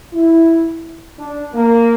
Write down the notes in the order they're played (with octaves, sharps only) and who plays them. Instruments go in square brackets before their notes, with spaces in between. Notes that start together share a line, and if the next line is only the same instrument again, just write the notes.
[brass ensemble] E4
D4
A#3